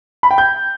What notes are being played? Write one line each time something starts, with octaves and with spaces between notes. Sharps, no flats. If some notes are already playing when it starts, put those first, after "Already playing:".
B5
G5
G6